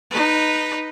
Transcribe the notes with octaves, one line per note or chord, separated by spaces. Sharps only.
D#4 B4